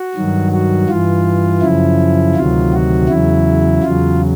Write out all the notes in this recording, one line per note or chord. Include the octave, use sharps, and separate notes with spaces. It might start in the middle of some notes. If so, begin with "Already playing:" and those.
Already playing: F#4
G2 D#3 F#3
F#4
G2 E3 F4
F#2 C#3 F3 E4
D2 C3 D#3 F#3 F4
F#4
E2 C#3 F#3 E4
E2 C#3 F#3 F4